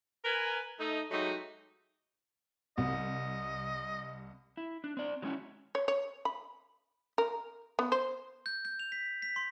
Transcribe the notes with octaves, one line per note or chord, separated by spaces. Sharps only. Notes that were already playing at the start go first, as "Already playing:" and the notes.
A#4 B4 G#5
A3 D#4
F#3 G#3 A3 D#4 F#4 G4
C2 D#5
E4
D4
C4 D5
F#3 G#3 A3 C#4 E4 F#4
C#5
C#5
B5
A#4
B3
C5
G6
G6
F7
B6
B6
C6